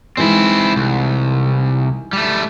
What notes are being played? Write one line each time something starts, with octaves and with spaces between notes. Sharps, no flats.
E3 G#3 C4 D#4 E4
C2
G3 A3